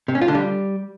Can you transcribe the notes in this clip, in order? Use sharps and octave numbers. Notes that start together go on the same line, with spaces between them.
C3
C#4
F4
D3
G3